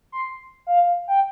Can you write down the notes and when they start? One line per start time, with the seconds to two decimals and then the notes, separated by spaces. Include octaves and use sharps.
0.12 C6
0.67 F5
1.08 G5